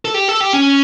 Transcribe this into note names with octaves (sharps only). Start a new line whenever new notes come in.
A4
G4
A4
G4
C#4